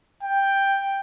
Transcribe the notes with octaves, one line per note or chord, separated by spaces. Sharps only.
G5